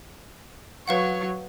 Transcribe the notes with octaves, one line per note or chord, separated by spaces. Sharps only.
F#3 B4 C#5 F5 F#5